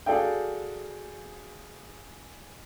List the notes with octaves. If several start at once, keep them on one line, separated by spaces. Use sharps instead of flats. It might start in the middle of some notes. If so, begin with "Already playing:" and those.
F#4 G#4 A4 D5 F5 G5